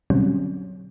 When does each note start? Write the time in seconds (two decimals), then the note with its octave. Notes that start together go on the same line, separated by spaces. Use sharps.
0.10 B2 D3 F#3 G3 C4 C#4